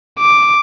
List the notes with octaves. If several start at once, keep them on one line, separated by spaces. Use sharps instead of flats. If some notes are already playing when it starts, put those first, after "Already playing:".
D6